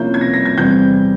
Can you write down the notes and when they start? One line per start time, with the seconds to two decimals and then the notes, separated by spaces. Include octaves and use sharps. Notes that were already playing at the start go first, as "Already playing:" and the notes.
Already playing: C3 F3 A#3 C#4 E4 G6
0.14 G#6
0.21 A#6
0.33 A#6
0.45 G#6
0.57 E2 C3 G3 C4 G6